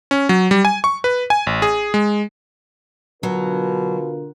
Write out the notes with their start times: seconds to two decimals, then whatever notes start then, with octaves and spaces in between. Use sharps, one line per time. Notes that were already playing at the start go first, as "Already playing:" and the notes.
0.11 C#4
0.29 F#3
0.51 G3
0.65 G#5
0.84 C#6
1.04 B4
1.30 G#5
1.47 A1
1.62 G#4
1.94 G#3
3.23 B2 D3 F#3 F4 A#4